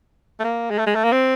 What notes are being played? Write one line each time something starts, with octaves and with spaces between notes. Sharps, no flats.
A3
A#3
G#3
A3
G#3
A3
A#3
C4